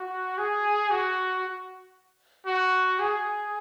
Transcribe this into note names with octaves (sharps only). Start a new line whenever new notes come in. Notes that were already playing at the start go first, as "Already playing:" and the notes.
Already playing: F#4
G#4
F#4
F#4
G#4